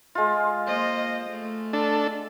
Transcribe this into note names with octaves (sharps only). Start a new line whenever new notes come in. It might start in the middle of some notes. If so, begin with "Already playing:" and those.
G#3 F4
A#3 C5 D#5
A3
D4 A4